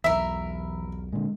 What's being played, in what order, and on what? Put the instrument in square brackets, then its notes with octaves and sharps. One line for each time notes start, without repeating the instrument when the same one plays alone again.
[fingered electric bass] B1 E2 [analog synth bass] E3 [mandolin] A#4 B5 [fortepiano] E5
[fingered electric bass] A#2 D3 [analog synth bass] G#3